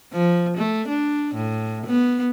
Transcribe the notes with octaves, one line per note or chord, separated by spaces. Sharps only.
F3
A3
D4
A2
B3